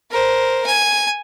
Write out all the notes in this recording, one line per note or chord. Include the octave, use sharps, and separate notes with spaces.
A#4 C5
G#5